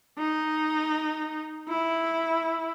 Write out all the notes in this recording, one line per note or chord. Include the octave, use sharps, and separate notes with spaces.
D#4
E4